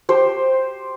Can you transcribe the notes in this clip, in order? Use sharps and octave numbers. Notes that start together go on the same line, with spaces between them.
G4 C5